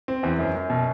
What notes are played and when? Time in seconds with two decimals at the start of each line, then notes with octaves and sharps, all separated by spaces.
0.08 C4
0.23 E2
0.39 F#2
0.55 F#2
0.70 B2